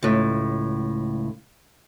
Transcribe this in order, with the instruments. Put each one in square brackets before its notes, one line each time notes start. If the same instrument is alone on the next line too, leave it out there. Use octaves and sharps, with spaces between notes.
[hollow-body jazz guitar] C#2 A2